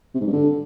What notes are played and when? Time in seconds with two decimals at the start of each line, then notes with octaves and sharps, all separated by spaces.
0.15 C3
0.21 G#2
0.27 G2
0.33 D3